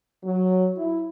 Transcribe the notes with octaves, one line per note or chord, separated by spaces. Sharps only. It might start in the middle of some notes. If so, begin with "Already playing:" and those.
F#3
E4